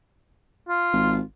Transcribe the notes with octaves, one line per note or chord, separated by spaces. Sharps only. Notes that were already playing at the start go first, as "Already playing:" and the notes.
F4
G#1